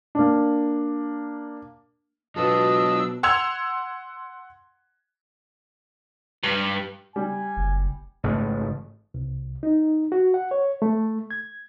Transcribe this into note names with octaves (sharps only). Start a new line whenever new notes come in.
A#3 D4
B2 F#3 B3 D4 F4 A4 D#5 E6
F#5 C6 E6 G#6 F7
G2
G3 G#5
F#1
A1 G#2 C#3 A3
C2
D#4
F#4
F#5
C#5
A3
G#6